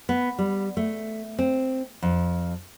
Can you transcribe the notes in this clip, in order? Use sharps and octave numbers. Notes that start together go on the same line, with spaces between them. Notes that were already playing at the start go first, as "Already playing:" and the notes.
B3
G3
A3
C4
F2